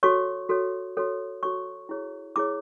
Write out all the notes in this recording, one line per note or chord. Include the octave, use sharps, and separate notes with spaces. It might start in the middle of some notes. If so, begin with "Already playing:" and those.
F#4 A4 C#5 C#6
F#4 A4 C#5
F#4 A4 C#5
F#4 A4 C#5 C#6
E4 G#4 C#5
E4 G#4 C#5 D6